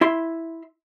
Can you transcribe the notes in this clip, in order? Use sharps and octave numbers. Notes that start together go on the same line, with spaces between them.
E4 E5 C6